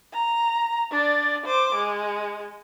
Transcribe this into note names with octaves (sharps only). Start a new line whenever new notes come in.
A#5
D4 D5
C5 D6
G#3